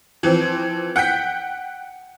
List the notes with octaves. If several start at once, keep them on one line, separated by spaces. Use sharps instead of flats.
E3 F3 C4
F#5 G5 G6 B6